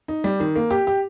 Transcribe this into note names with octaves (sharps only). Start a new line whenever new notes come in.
D#4
G3
D#3
A#3
G4
G4